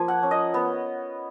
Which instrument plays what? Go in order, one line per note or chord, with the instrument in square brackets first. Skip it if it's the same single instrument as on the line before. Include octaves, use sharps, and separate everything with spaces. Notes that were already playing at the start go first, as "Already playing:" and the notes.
Already playing: [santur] F3 A#3 G#5
F#5
C#4
D#5
B3